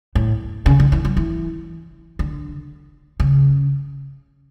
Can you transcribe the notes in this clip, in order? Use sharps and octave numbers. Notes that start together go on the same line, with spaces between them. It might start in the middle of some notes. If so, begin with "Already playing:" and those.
A2
C#3
D3
E3
F#3
E3
D3
C#3